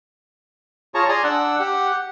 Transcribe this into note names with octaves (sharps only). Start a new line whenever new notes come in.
F4 G#4 C#5 A5 A#5 C#6
G#4 D5 G#5 A#5 C6
D4 F#5 E6 F#6
G4 F#5